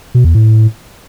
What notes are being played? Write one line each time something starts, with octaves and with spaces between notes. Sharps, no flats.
B2
E2
A2